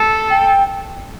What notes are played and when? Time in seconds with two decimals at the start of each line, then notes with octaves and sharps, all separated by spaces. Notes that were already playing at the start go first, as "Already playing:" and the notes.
Already playing: A4
0.30 G5